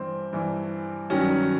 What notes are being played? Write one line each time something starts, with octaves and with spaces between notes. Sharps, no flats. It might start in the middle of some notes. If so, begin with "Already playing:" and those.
Already playing: G2 E3 C4
G2 E3
G2 D#3 F#3 C#4